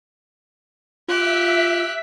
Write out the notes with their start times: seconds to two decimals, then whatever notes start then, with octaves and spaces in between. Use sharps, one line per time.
1.08 F4 G4 E5 F#6 B6